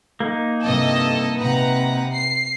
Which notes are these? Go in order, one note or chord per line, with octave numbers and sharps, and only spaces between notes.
A#3 D#4
G2 C3 A4 D#5
C3 B4 F#5 A#5
C7